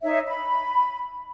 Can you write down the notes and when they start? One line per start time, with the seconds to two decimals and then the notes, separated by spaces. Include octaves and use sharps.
0.02 D#4 C#5 E5
0.27 B5